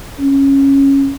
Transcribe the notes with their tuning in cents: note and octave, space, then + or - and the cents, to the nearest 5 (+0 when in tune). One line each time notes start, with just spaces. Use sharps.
C#4 -10